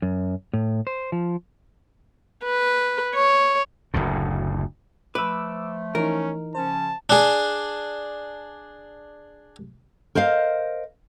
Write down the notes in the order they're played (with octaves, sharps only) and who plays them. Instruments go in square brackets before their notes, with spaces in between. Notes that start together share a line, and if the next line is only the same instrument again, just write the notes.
[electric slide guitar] F#2
A2
C5
F3
[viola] B4
C#5
[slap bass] F#1 D2 A2
[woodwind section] F3 A3 [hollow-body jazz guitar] B4 [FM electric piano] D6 E6
[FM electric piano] E3 D#4 [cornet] C#4 [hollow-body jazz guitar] A#4
[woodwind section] C#3 F3 C#4 [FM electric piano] C5 [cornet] A5
[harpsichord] D4 G#4
[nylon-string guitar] A#4 C5 D#5 F5